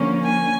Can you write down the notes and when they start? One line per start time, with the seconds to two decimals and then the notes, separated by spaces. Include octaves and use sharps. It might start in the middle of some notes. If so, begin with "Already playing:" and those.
Already playing: D3 F3 A#3 C#4
0.23 G#5